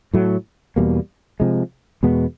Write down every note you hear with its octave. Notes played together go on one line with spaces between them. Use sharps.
A2 F#3 A3
E2 B2 G3 A#3
C3 F3 G#3
E2 B2 G#3 B3